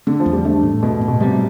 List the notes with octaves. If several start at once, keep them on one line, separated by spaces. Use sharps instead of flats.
D3 A3
F3
E2
G3
A3 D4
A2
B2 A3
A2
B2
C3 G3